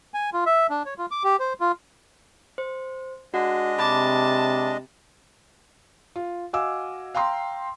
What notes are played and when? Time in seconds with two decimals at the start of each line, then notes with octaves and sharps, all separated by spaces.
0.14 G#5
0.33 F4
0.46 E5
0.70 D4
0.86 C#5
0.98 F4
1.11 D6
1.24 G4
1.39 C5
1.60 F4
2.58 C5
3.34 G#3 D4 F#4 D#5 F#5
3.79 C3 A5 B5 D6
6.16 F4
6.53 F#4 D#5 F5 G#5 D6 E6
7.15 F5 G5 A#5 C6